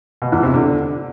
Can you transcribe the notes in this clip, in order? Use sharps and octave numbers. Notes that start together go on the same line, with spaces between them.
B2
E2
C3
D3